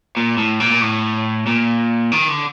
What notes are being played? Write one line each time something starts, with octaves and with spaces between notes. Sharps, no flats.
A#2
A2
A#2
A2
A#2
D#3
D3